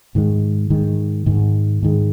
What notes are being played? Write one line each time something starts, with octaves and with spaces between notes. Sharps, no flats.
G#2 D#3 G#3
G#2 D#3 G#3
G#2 D#3 G#3
G#2 D#3 G#3